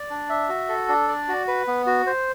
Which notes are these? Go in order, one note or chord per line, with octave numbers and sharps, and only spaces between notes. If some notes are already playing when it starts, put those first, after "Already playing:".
Already playing: D5
D4
E5
F#4
A4
D4
D5
F#4
B4
B3
F#4
C5